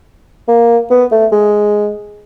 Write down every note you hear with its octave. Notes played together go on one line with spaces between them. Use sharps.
A#3
B3
A3
G#3